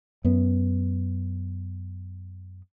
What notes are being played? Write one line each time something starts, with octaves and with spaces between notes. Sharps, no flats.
F#2 B3